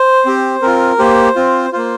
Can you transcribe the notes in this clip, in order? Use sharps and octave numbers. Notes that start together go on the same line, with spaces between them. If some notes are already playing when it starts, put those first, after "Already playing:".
Already playing: C5
C4 G4
C4 F4 A#4
A#3 G4 C5
C4 F4
A#3 F4 C5